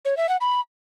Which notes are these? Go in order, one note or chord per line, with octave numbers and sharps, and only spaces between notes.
C#5
E5
F#5
B5